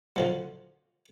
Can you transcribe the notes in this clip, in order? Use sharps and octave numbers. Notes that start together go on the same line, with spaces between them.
D3 F3 F#3